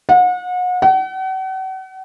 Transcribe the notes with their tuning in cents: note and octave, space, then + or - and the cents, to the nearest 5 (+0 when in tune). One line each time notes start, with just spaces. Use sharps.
F#5 -35
F#5 +40